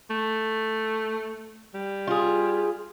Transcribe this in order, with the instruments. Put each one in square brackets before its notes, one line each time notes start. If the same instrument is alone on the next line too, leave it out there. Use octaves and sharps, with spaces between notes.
[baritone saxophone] A3
G3
[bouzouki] F4 G#4